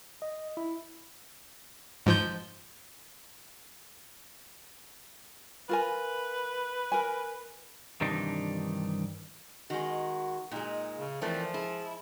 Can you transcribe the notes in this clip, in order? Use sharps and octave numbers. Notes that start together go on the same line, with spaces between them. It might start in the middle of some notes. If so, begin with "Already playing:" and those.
D#5
E4
G#2 F3 G6
F4 A#4 B4 G#5
A#4 G#5
G2 C3 D#3 E3 D4 D#4
D#3 G#3 F#4
A#2 G#3 D#4
C#3
A#2 E3 F3 A3 C4
G#3 E4